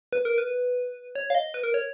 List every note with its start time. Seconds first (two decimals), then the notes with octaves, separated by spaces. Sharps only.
0.13 B4
0.25 A#4
0.38 B4
1.15 C#5
1.30 F5
1.35 D#5
1.54 B4
1.63 A#4
1.74 C#5